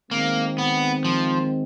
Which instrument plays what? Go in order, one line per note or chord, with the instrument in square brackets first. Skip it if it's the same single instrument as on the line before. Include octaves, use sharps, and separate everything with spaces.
[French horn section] D#3 G#3 C4 [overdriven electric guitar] A#3
[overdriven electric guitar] B3
F3